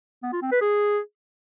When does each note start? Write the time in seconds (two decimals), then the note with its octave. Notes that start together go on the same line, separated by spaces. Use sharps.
0.23 B3
0.32 F4
0.42 C4
0.51 B4
0.61 G#4